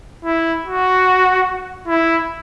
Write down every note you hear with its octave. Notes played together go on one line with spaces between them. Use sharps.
E4
F#4
E4